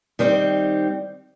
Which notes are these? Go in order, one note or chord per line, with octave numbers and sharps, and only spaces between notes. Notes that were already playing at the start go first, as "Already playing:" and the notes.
D#3 G3 C4